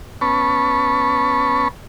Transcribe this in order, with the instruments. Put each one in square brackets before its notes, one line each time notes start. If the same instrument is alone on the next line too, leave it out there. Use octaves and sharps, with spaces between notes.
[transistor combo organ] B3 C#4 A5 B5 C#6